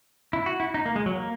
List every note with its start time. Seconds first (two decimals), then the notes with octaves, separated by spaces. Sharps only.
0.33 E4
0.46 F#4
0.60 E4
0.74 D#4
0.86 A#3
0.96 G#3
1.06 F#3
1.16 A#3